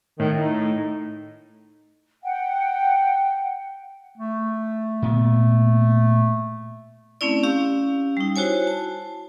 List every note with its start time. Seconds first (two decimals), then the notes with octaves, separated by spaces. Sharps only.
0.20 A2 D#3
0.39 D#4
2.23 F#5 G5
4.18 A3
5.03 A#2 B3
7.21 A3 C4 C#4 E4 D5
7.43 C#4 G4 F5 E6
8.17 G3 D#4
8.36 E4 F#4 C5 C#5 G#5
8.67 A5